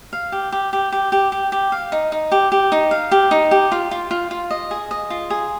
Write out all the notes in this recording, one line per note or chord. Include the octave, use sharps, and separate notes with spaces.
F5
G4
G4
G4
G4
G4
G4
G4
F5
D#4
D#4
G4
G4
D#4
F5
G4
D#4
G4
F4
F4
F4
F4
D#5
G#4
D#5
F4
G#4